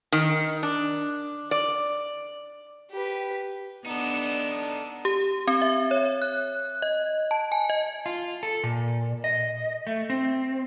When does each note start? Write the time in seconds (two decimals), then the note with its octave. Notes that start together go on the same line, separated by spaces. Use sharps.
0.12 D#3
0.63 D4
1.51 D5
2.91 G4 B4
3.86 B3 D4 D#4 A4
5.05 G4
5.47 C4
5.62 E5
5.91 C#5
6.22 F#6
6.82 D#5
7.31 A5
7.52 G#5
7.70 D#5
8.06 F4
8.43 A4
8.63 A#2
9.24 D#5
9.87 A3
10.10 C4